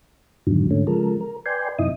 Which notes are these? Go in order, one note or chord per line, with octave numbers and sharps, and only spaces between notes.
F2 G#2 B2 D3 D#3 F#3
G#2 D3 A3 C#4
C#3 F3 G#3 A4 A#4
A#4
B4 D5 G5 G#5 C6
F#2 C3 D#4 E4 D#6